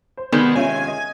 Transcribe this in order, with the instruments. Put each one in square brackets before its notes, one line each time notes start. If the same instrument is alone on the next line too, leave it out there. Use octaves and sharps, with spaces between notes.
[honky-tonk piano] C5
[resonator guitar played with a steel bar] C3 D#3 G#3 [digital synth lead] B3 [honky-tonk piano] D4 G6
[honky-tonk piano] C#4 F4 E5 [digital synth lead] G#5
[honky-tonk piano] D#5